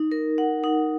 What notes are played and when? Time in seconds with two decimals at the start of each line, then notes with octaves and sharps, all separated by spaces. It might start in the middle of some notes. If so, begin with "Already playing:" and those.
Already playing: D#4
0.12 A#4
0.38 F#5
0.64 D#4